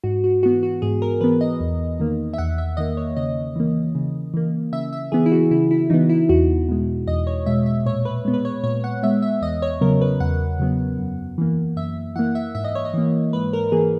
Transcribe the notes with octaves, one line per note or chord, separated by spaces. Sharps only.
G#2 F#4
F#4
E3 B3 F#4
F#4
G#2 G#4
A#4
E3 B3 B4
D#5
E2
D#3 A#3
E5
E2 F#5
E5
D#3 A#3 D#5
C#5
C#3 D#5
E3 A#3
C#3
E3 A#3
C#3 E5
E5
E3 B3 G#4
E4
F#4
C#3 E4
E4
E3 B3 D#4
E4
E2 F#4
B2 G#3
E2 D#5
C#5
B2 G#3 E5
E5
A#2 C#5
B4
G#3 B3
B4
C#5
A#2 C#5
F#5
G#3 B3 E5
E5
E2 D#5
C#5
C#3 F#3 B3 A#4
B4
E2 F#5
C#3 F#3 B3
F#2
E3 A#3
F#2 E5
E3 A#3 F#5
E5
G#2 E5
D#5
C#5
D#5
E3 A#3
G#2 B4
A#4
E3 A#3 G#4